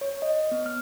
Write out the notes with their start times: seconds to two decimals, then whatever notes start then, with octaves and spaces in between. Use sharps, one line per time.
0.01 C#5
0.22 D#5
0.51 B3
0.66 F6